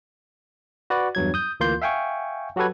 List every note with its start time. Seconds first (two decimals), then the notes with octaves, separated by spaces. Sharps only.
0.90 F#4 B4 D5
1.15 E2 G2 F#3 G#6
1.34 D#6 G6
1.60 D2 E3 A#3 F4 C6 G6
1.82 E5 F5 G5 G#5 C#6
2.56 F#3 F#4 G4 A4 B4 G#6